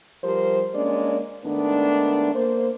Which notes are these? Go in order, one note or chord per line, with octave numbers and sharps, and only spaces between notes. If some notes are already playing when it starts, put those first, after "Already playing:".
F3 G3 G4 A#4 C5
G#3 A#3 C#4 D4 D5
G#2 D#3 A3 B3 D4
A#3 C5